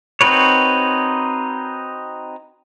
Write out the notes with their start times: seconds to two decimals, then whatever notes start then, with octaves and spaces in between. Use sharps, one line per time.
0.21 C4 D#4 F#4 B4 C#5